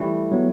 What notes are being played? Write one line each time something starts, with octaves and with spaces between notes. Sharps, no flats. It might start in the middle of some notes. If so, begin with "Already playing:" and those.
Already playing: E3 G3 A3
F#3 B3